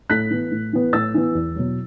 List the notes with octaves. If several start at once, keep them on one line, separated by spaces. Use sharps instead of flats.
A2 F#6 B6
E3 B3
A2
E3 B3
A2 E6 A6
E3 B3
E2
B2 F#3